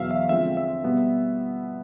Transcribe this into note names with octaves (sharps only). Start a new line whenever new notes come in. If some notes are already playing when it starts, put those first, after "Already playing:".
Already playing: E2 B2 F#3 B3 E5 F5
E5
D3 F3 G#3 C4 E5
E5
B2 G3 B3